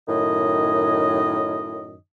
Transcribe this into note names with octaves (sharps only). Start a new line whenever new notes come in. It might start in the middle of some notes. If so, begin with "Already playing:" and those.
F#2 A2 D#3 D#5